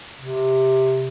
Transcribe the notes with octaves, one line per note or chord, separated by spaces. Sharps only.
C3